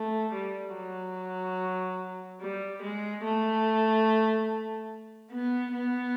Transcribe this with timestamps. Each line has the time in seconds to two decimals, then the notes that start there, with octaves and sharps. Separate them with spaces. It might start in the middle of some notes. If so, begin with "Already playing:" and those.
Already playing: A3
0.33 G3
0.75 F#3
2.41 G3
2.82 G#3
3.24 A3
5.31 B3
5.72 B3